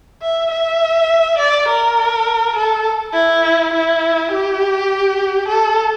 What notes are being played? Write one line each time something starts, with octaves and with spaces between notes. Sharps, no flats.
E5
E5
D5
A#4
A4
E4
E4
G4
A4